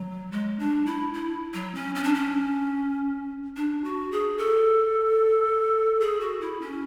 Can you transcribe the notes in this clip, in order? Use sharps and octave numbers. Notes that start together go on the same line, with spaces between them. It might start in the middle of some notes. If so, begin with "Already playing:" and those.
Already playing: F#3
G#3
D4
E4
E4
F#3
C#4
C#4
D4
C#4
D4
F#4
G#4
A4
G#4
F#4
E4
C#4